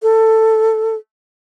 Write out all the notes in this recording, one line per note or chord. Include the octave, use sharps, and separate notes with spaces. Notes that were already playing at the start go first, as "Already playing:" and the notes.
A4